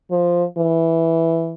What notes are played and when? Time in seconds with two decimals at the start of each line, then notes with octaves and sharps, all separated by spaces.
0.11 F3
0.58 E3